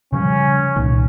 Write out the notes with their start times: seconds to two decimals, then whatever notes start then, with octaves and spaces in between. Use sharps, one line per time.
0.13 C#3 F3 G3 C#4
0.76 C2 A#2 D#3